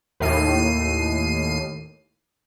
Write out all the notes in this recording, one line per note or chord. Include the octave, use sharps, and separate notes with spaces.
D#2 A2 C7 D#7